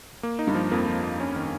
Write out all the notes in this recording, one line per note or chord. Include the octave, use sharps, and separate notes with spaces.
A#3
D#4
G2
F3
F2 A#3
F3
A#3
C#4
D#3